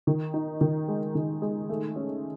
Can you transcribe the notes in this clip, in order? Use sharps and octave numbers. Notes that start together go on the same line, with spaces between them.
D#3
D#4
D#3
G#3
D#3
G#3
A3
C#4